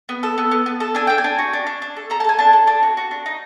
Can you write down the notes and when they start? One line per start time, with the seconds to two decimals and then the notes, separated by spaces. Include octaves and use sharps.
0.09 B3
0.23 A4
0.38 B3
0.51 B3
0.66 B3
0.80 A4
0.95 D4 G#5
1.07 D4 G5
1.18 G#5
1.24 D4
1.39 F#4
1.53 D4
1.67 D4
1.82 D4
1.97 A4
2.10 A4 A#5
2.20 A5
2.24 A4 G#5
2.39 D4 A5
2.53 A4
2.67 D4
2.83 F#4
2.97 F#4
3.11 D4
3.26 D#4